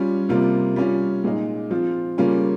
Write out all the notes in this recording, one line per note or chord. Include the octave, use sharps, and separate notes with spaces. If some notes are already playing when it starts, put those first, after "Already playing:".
Already playing: G3 C#4 F4
C3 G3 A#3 F4
G3 C#4 F4
A#2 G#3 D#4
F3 C4 F4
C#3 G3 A#3 C#4 F4